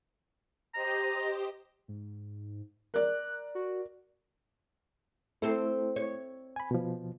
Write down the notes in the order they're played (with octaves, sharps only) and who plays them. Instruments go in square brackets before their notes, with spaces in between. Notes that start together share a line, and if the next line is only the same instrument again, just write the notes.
[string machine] G4 C5 D#5 [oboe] A#5
[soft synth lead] G#2
[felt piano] A#4 D5 [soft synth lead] F#6
[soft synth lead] F#4
[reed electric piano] A3 E4 [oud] C4 A4
[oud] C#5
[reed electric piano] G#5 B5
B2 F3